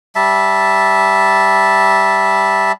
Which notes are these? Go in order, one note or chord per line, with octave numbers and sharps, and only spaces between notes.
G3 E5 A5